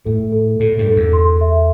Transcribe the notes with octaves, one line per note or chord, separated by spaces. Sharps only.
A2 A4
A4
A2 A4
G2
A4
E2
C6
E5